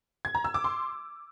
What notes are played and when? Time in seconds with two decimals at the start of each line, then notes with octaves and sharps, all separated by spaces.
0.25 G#6
0.35 A#5
0.44 E6
0.54 D6
0.64 C6